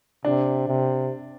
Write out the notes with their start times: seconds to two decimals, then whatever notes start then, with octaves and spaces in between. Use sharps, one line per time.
0.25 C3 D4
0.67 C3